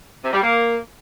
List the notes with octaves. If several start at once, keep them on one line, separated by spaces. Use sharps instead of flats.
C3
G3
A#3